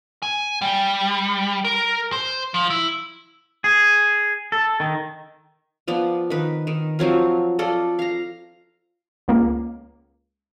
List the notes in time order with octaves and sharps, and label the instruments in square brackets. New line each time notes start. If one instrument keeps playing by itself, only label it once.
[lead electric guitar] G#5
G3
A#4
C5
F3
E4
[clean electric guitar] G#4
A4
D#3
[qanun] F3 B3 D5
D#3 B4
D#3
F3 F#3 C4 F4
F4 A4 D5 D#5
F5 A#5
[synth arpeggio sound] C#2 A#3